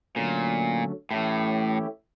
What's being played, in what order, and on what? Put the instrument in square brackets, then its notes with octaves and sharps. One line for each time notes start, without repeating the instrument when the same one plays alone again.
[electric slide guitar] A#2 [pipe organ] D3 F#3 A3 C#4
[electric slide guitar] A2 [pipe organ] E3 A3 C#4 E4 G4